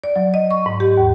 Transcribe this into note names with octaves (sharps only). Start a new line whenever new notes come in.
D5
F#3
D#5
C#6
G#2
G4
D#2